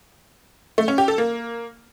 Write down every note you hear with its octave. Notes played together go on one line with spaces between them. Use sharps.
A3
C#4
G4
A4
A#3